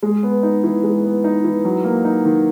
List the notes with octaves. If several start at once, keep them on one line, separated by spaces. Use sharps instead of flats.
G#3
B3
D#4
E3
G#3
B3
D#4
E3
F#3
A#3
D#4
D#3